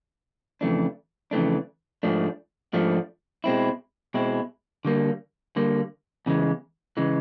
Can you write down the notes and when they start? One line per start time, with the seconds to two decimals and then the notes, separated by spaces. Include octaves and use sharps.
0.61 F2 C#3 E3 A3 D4
1.31 F2 C#3 E3 A3 D4
2.03 G#2 F3 A3 D4
2.73 G#2 F3 A3 D4
3.44 B2 G#3 C4 E4
4.14 B2 G#3 C4 E4
4.85 D3 G3 A#3
5.56 D3 G3 A#3
6.26 E2 C#3 E3 G#3
6.97 C#3 E3 G#3